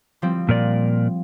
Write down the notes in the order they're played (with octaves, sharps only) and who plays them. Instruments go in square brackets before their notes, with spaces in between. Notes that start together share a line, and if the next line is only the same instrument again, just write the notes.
[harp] F3 G3 C4
[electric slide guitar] A#2 A#4 D5